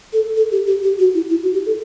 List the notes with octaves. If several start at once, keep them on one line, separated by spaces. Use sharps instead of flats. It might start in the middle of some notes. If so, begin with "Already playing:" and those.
A4
A4
G4
G4
G4
F#4
E4
E4
F#4
G4
A4